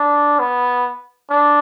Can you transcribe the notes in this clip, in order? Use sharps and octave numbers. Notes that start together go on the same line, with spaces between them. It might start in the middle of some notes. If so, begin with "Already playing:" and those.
Already playing: D4
B3
D4